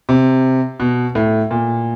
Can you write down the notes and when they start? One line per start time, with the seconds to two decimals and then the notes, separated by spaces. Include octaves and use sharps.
0.09 C3
0.80 B2
1.15 A2
1.51 A#2